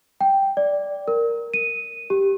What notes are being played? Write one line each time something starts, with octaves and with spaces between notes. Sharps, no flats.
G5
D5
A#4
D#7
G4